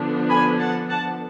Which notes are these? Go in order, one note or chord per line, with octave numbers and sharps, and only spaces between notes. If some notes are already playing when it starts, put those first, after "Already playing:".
Already playing: D3 F3 B3 D4
G#5 B5
F#5 A5
F#5 A5